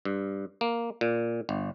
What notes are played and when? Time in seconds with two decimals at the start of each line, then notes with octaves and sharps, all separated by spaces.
0.05 G2
0.61 A#3
1.01 A#2
1.49 G1